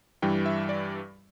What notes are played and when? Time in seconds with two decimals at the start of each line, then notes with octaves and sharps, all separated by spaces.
0.22 G2 E3 G3 G5
0.46 E5
0.69 D5